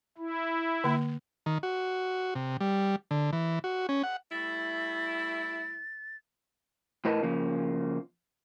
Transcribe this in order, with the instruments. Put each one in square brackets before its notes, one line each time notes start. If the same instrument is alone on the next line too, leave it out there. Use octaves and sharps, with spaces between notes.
[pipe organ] E4
[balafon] D3 A#3
[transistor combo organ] D#3
F#4
C3
G3
D3
E3
F#4
C#4
F#5
[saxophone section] G3 A3 E4 [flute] A6
[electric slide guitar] A2 E4 A#4 B4 D#5 A5
C#3 F3 A#3